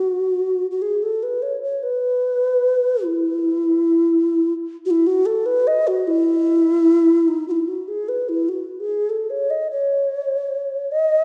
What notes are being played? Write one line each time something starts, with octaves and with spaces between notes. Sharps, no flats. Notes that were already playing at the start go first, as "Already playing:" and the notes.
Already playing: F#4
F#4
G#4
A4
B4
C#5
C#5
B4
E4
F#4
E4
F#4
A4
B4
D#5
F#4
E4
D#4
F#4
E4
F#4
G#4
B4
E4
F#4
G#4
A4
C#5
D#5
C#5
D#5